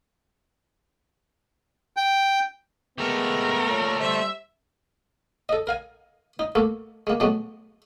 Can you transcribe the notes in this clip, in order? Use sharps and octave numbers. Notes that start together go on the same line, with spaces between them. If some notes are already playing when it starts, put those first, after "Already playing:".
G5
G#3 A3 B3 G4 A#4
A#2 C#5
G3 C5 E5
A4 D#5
A#4 F5 G#5
D#4
A3 A#3 A4
G#3 A#3
B2 F#3 G#3 A3 B3